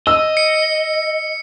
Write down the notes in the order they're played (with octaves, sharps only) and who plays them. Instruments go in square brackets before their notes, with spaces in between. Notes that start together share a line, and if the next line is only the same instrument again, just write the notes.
[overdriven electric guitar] D#5 [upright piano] E6
[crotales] C#7